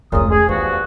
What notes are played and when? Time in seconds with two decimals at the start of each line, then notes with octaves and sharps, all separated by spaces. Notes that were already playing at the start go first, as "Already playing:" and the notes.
0.12 F1 C#2 A#2 C#3 D#6
0.31 G#4
0.49 E2 G2 F3 F#4